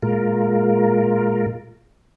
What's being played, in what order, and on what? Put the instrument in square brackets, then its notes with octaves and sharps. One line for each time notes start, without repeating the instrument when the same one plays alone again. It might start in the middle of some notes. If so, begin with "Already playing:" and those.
[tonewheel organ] A#2 G#3 F4 A#4